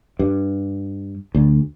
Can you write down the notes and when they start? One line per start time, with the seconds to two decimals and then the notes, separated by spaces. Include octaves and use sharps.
0.19 G2
1.35 D2